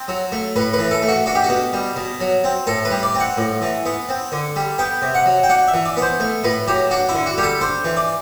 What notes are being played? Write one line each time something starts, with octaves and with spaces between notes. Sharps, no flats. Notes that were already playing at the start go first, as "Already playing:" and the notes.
Already playing: C4
F#3
A3
A2 B4
B4
E3
A4
A3
F#4
D4 F#4
G4
F#4
B2
G3
B2
F#3
C4
A2 A4
B4
G3
D5
C4
F#5
A2
E3
B3
C4
D3
G3
B3 G5
C3
F#5
F#3
G5
D4 F#5
E5
E3
D5
B3
C5
A3
A2 B4
F#3 G4
D4 F#4
E4
D3
F#4
G3 G4
A4
D4 C5
E3
D5